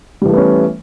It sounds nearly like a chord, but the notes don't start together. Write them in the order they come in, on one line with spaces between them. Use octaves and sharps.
G3 E3 A3 B3 C#4